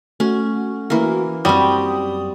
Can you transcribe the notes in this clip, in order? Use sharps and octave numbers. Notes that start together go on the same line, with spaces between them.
A3 C#4 F#4
E3 A#3
F#2 G3 C4 F#4 B5 D#6